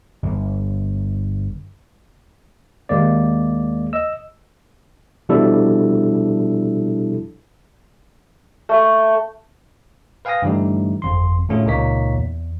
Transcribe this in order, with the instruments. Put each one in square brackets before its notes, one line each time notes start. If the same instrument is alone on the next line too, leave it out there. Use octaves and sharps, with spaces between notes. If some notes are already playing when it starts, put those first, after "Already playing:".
[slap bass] G1
[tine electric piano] D#2 G#3 A#3 D5
D#5 E6
B2 F3 G3 D4 E4 A4
[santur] A3
[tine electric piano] B4 F5 G5 G#5 D#6 A#6
G2 D3 E3 G3 A3 D#4
G1 F2 C6
A2 D3 A3 C#4 F4 G#4
C#2 A#2 A#3 D#4 C#5 B6
E2